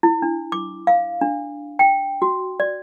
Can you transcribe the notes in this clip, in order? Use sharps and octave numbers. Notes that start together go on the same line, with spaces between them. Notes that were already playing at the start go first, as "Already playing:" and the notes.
E4
D4
D6
F5
D4
G5
F#4
D5